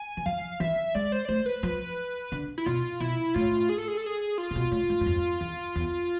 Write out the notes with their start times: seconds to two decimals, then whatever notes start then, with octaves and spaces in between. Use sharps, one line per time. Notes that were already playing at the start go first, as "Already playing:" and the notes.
Already playing: G#5
0.17 E3
0.26 F3 F5
0.60 E3 E5
0.95 G#3 D5
1.12 C5
1.25 D5
1.29 A3 C5
1.46 B4
1.63 F3
2.32 D3
2.58 E4
2.66 B2 F4
3.00 B2 E4
3.34 A2 F4
3.69 G#4
3.78 A4
3.88 G#4
3.97 A4
4.06 G#4
4.38 F4
4.51 C3
4.56 B2
4.72 A2
4.90 G#2
5.01 G#2
5.06 F2
5.41 E2
5.76 E2